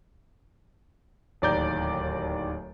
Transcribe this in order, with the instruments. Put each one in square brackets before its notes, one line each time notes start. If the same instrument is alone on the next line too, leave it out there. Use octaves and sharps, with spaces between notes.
[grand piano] D1 D#2 D5 A#5 G6